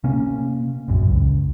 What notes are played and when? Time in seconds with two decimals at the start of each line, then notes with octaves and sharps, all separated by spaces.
0.04 C3 A#3 C#4
0.88 A#1 F#2
1.05 C#2